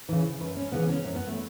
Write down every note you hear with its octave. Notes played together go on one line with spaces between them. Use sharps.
C#3 E3
F#2 B4
C#4
C#3 E3 B3
C#4
F#2 C#4
B3
A3